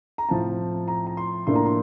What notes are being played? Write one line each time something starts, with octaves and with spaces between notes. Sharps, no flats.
A#5
A2 F3 C4 A5
A#5
A#5
C6
A2 F3 A#3 D4 C6
A#5
C6